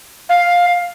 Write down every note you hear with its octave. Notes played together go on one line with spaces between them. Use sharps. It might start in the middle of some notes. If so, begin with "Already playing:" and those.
F5